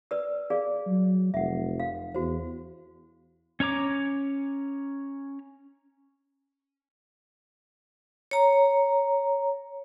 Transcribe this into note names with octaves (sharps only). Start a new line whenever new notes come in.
B4 D5 E6
G#4 D5 F5
F#3
F1 E5 F#5
F5
E2 F#4 C5
C#4 C#5 A#5 D6
C#5 A#5